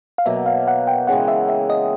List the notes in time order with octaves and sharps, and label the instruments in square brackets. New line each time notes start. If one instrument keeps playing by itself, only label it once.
[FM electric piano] F5
[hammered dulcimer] B2 F#3 A#3 [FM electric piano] E5
[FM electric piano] F5
F#5
G5
[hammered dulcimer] C#3 E3 G#3 [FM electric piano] F#5
[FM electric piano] E5
E5
D#5